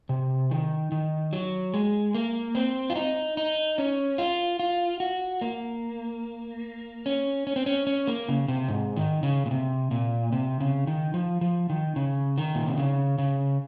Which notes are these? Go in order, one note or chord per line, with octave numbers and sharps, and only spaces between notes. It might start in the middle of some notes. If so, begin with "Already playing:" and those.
C3
D#3
D#3
F#3
G#3
A#3
C4
F4
D#4
D#4
C#4
F4
F4
F#4
A#3
C#4
C#4
C4
C#4
C#4
A#3
C#3
C3
G#2
D#3
C#3
A#2
C3
A#2
C3
C#3
D#3
F3
F3
D#3
C#3
D#3
A#2
C3
C#3
C#3